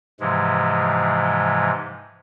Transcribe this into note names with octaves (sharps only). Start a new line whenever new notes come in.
G#2 C3 E3 F3 G#3